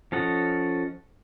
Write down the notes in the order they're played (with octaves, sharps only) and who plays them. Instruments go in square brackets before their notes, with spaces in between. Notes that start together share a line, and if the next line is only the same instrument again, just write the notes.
[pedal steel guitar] F3 C#4 A4 D#5 F#5